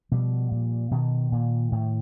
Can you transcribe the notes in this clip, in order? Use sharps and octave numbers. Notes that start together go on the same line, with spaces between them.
B2 F3 G3
A#2
B2 D#3
A#2
A2